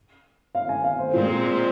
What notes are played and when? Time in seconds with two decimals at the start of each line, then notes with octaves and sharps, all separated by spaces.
0.55 F5
0.69 G#5
0.84 F5
0.99 C5
1.13 A#2 G#3 C4 F4
1.28 G#4
1.57 C5